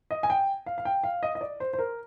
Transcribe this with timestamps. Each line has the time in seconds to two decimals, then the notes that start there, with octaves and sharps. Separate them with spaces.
0.11 D#5
0.23 G#5
0.30 G5
0.66 F5
0.78 F5
0.85 G5
1.04 F5
1.23 D#5
1.35 D#5
1.41 D5
1.60 C5
1.73 C5
1.79 A#4